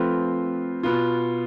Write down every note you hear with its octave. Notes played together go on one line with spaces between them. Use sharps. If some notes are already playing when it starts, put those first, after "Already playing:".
Already playing: F3 A3 C4 F4 B4
B2 B3 F4